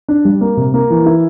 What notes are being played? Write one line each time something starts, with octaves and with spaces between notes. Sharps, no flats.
D4
G3
A#3
C3
A#3
E3
E4